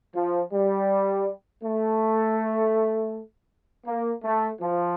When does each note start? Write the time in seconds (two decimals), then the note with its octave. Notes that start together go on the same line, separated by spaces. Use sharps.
0.15 F3
0.52 G3
1.63 A3
3.86 A#3
4.24 A3
4.61 F3